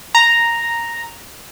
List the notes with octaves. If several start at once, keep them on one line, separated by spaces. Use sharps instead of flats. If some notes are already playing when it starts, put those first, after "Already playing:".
A#5